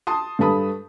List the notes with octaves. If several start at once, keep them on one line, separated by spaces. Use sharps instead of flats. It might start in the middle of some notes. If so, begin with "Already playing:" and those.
A5 C6 D#6
G2 A4 B4 A5 B5 D#6